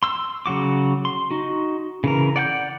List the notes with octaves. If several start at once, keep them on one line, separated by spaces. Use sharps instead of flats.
C6 E6
C#3 F#3 F#4 D6
C6
D#4 F#4
C#3 E3 A#4
D5 F#5 G5 G6